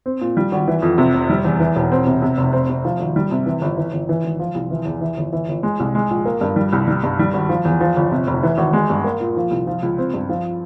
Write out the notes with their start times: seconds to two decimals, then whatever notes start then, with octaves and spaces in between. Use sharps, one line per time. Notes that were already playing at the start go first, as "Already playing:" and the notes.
0.06 C4
0.21 A#2
0.37 G3
0.52 G#1
0.68 E3
0.82 F2
0.98 C3
1.14 F1
1.30 G3
1.45 E2
1.60 E3
1.76 E1
1.92 C4
2.07 C3
2.22 C3
2.37 F1
2.53 C4
2.69 C3
2.85 F3
3.00 G#1
3.16 G3
3.31 C3
3.46 E3
3.61 G1
3.77 E3
3.92 G1
4.09 E3
4.24 G#1
4.39 F3
4.55 C2
4.71 E3
4.85 E2
5.01 E3
5.17 G1
5.33 E3
5.49 G1
5.63 G#3
5.80 C2
5.95 G#3
6.10 A#1
6.25 A#3
6.41 G2
6.56 G3
6.73 C2
6.88 G3
7.04 G2
7.19 G3
7.34 G#1
7.49 F3
7.65 E2
7.81 F3
7.96 G1
8.12 C3
8.27 F1
8.43 E3
8.58 G#1
8.73 G#3
8.90 G2
9.04 A#3
9.21 A#2
9.36 F3
9.51 C2
9.67 F3
9.83 C#2
9.98 C4
10.14 G2
10.30 F3